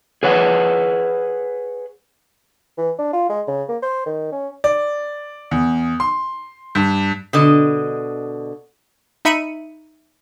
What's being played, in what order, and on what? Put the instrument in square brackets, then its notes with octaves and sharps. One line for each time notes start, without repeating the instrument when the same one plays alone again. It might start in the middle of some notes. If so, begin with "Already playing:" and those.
[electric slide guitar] G#4 B4 C#5 F#5
[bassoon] E3
D4
F4
G#3
C#3
A#3
C5
D#3
C#4
[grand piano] D5
E2
C6
G2
[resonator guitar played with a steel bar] B2 D3 D#5
[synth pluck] D#4 E5 B5 C#7 D#7